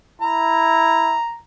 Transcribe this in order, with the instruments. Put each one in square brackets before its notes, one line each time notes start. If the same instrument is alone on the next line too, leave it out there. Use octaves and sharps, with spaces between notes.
[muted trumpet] E4 [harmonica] A#5